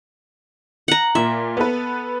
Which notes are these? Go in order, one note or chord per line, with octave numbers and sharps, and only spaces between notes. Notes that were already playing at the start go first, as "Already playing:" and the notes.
F#5 A#5
A#2 E5
B3 A4 B4